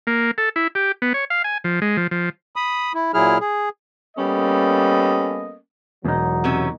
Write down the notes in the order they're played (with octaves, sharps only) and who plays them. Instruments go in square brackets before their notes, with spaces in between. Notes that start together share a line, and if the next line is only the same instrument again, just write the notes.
[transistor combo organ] A#3
A4
E4
G4
B3
C#5
F5
G#5
F3
G#3
F3
F3
[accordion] B5 D#6
E4
A#2 F#3 E4 G#4 F6
G#4
[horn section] G3 A#3 B3 C#4 A4 D#5
[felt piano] E1 [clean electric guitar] E2 D#4 [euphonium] F#3
[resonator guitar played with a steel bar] C3 E3 C#4